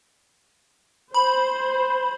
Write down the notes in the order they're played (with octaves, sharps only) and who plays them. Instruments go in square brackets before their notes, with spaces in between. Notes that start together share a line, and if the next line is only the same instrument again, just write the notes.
[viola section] C5 [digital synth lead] B5